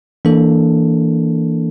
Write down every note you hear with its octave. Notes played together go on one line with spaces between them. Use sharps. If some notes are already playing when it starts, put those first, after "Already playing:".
E3 A#3 D4 A4